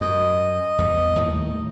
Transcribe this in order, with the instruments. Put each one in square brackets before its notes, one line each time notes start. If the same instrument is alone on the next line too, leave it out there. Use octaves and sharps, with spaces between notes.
[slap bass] F#2 [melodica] D#5
[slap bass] E2 G3
D#2 A2 D#3